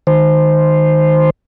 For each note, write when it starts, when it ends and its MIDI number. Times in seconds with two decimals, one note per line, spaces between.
0.07 1.30 51
0.07 1.30 72